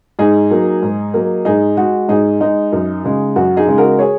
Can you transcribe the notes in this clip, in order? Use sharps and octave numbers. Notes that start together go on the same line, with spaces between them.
G#2 D#4 G#4
F#3 A#3
G#2
F#3 A#3
G#2 D#4 G#4
G#3 F#4
G#2 D#4 G#4
G#3 D#4
F#2
C#3 G#3
F#2 F#4
D#4 G#4
C#3 G#3
F#4 A#4
G#4 C#5